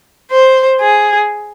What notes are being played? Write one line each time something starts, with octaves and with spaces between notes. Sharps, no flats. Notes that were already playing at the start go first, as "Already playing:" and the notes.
C5
G#4